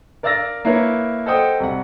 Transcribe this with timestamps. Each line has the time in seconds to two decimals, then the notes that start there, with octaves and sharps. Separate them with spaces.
0.23 A#4 D5 F5 E6 A6 A#6
0.65 A#3 E4 A#4 B4 C#5
1.26 A4 C5 D#5 F#5 G5 D#6
1.60 C2 F#5